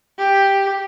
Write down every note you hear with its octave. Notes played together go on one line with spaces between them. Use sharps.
G4